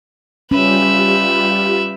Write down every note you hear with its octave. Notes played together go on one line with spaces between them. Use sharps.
G3 C#4 F4 G4 B4 E5